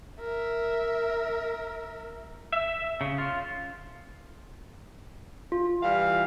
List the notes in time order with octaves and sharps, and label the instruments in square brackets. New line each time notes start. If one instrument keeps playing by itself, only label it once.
[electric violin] A#4 E5
[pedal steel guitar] E5
C#3
F4
[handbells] F4
[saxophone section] E3 G3 F5